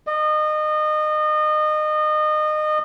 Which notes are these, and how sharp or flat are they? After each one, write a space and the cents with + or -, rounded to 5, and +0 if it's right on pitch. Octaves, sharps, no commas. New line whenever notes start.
D#5 -30